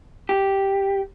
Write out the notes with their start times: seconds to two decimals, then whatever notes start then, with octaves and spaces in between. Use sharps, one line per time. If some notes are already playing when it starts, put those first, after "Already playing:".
0.29 G4